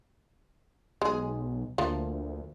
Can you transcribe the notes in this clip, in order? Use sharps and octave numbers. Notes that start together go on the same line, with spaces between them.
B1 G#3 G#4
D2 F3 A3 A#3